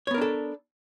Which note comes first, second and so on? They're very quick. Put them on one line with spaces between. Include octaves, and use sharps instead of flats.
C#5 B3 A#4 D4 A4